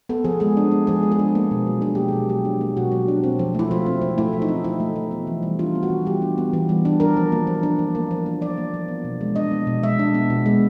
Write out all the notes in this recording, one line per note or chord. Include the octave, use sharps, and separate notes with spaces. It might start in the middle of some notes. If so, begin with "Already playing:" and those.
B3 A4
F3 G#4
G#3 G#4
D4
B3
F3 G#4
G#3
G#4
D4
A#3
B2
F#3
D4 G#4
A#3 G4
B2 G#4
F#3 G4
D4
A#3
B2 F#4
F#3
D4
C4
F3
A3 E4
F3 F4
C4
F3
A3 E4
F3
D#4
C4
F3 E4
A3
F3
B3
E3
G3
D4 F4
B3
F#4
E3
G3 G4
D4
B3
E3
G3
D4
D4 A#4
F3
A#3
F3
D4
F3
A#3
F3
D4
F3 D5
A#3
F3
B3
B2
G#3
D4 D#5
B3
B2
G#3 E5
D4
B3
B2
G#3